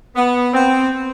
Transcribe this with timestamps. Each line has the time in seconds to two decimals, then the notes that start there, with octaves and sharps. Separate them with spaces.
0.16 B3
0.54 C4